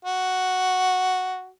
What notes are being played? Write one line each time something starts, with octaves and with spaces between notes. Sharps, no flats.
F#4